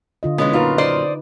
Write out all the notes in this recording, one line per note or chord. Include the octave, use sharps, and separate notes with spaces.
D3 F4 D#5
E3 G#3 B3 C#4
F#2 A#2 D#4 F4 B4
C5 D5 D#5